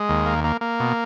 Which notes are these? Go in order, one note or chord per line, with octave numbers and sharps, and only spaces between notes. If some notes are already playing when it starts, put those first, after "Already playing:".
Already playing: G#3
D#2
A#3
A#3
A#3
B2